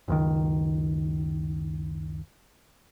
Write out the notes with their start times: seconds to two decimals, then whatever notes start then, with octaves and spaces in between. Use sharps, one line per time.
0.08 F#1 C#2 D#3